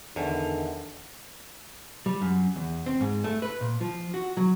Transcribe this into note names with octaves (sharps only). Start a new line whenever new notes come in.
E2 D3 D#3
G3
F#2
E2
C4
G#2
A3
B4
A#2
F3
F#4
F#3